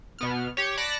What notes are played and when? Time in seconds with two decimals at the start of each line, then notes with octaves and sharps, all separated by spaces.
0.19 B2 B3 F6
0.57 G4 C#5
0.77 D5 A5 B5 F#6 A#6 C#7